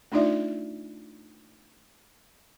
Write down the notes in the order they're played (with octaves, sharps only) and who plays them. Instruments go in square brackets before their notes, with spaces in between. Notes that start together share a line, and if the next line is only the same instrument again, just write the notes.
[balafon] A3 D4 D#4 F4 D5 E5